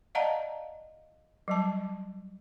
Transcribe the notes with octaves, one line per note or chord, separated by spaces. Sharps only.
D5 D#5 F5 F#5 A5 A#5
F#3 G3 A5